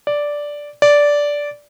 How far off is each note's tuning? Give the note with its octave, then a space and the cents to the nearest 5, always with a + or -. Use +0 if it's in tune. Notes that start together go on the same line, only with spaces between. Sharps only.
D5 -5
D5 -10